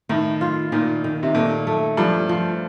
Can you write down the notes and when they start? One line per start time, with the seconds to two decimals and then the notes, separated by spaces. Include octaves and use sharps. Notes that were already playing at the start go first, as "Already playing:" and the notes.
0.09 A2 D#3
0.41 F4
0.72 A#2 D#3
1.04 D#3
1.23 C3
1.35 A#2 A3
1.67 A3
1.97 G2 F3
2.29 F3